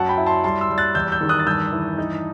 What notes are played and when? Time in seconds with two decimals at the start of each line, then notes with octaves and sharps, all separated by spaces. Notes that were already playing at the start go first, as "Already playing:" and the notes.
Already playing: F#2 F#3 F#5 A5
0.09 G5 B5
0.17 E4
0.27 A5 C6
0.44 G3 A5 C6
0.61 C6 E6
0.70 G3
0.78 F#6 A6
0.95 E2 E6 G6
1.12 E6 G6
1.21 D#3
1.29 D#6 F#6
1.39 A6
1.46 G2 E6 G6
1.72 E3
1.98 D#4